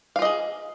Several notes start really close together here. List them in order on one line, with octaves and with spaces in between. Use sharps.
F5 F4 D#5 G#4